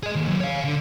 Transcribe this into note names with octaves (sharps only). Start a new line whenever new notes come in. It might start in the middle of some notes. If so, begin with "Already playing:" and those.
G#4 D#5
D#2
F#3 G#4
C#5 F5
D3